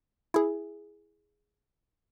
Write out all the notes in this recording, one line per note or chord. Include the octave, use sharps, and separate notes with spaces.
E4 G#4